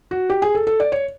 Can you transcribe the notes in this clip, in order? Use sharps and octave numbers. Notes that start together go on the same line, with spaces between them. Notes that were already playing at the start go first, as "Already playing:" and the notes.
F#4
G4
G#4
A4
A4
D5
C#5